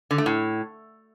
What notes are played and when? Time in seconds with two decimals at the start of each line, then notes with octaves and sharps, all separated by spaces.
0.11 D3
0.18 A3
0.26 A2